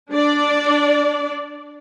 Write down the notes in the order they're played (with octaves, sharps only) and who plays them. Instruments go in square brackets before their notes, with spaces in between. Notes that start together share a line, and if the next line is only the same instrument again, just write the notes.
[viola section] D4 D5